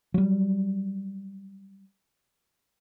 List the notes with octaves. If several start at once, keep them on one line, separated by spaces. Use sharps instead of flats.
F#3 G3